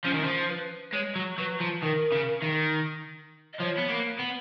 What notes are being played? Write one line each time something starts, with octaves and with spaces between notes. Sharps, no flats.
F3 C#4
D#3
F3
B4
G#3 C#5
F#3
F#3 B4
F3
D#3 A#4
C#3
D#3
D#5
F3 C#5
B3
A#3
B3